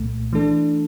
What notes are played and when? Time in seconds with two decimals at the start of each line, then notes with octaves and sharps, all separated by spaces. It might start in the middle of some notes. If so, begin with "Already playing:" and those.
Already playing: C2 A#2 A3
0.33 E3 A3 D4 A4